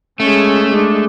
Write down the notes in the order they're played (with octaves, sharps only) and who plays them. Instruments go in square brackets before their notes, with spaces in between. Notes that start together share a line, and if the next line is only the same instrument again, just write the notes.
[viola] G#3 C#4 [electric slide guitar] A3
[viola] G#3 D4